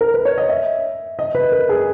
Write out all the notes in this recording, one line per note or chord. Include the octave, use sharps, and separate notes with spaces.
A#4
B4
C#5
D#5
E5
D#5
B4
A#4
G#4